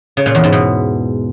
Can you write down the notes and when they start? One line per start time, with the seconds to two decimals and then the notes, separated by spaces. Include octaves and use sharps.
0.17 C#3
0.26 A#2
0.35 E2
0.44 G#2
0.52 B2